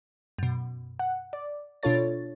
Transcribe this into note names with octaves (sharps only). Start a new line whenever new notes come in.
F#2 B2
F#5
D5
B2 D4 F4 A4 C#5 A6